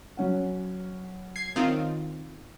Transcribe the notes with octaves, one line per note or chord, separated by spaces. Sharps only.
F#3 C#4 F#5
G#6 C7
D#3 C4 F4